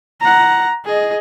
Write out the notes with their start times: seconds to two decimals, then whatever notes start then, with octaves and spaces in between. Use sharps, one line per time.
0.21 F#5 A#5
0.85 G#4 D#5